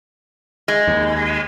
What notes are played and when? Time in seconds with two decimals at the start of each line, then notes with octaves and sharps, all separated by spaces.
0.68 G#3
0.87 D#2